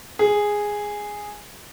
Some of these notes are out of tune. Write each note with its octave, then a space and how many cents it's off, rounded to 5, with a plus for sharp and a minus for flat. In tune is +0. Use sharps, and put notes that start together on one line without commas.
G#4 -5